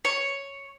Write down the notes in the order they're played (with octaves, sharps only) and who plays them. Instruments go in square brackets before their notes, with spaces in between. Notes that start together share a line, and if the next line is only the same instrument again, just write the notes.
[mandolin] C#5